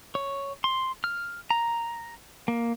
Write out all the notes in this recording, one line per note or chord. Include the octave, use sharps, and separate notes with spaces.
C#5
C6
F6
A#5
A#3